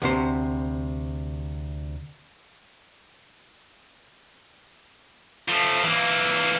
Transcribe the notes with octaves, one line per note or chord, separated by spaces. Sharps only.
D2 C3 C5
F3 A3
E3 A#3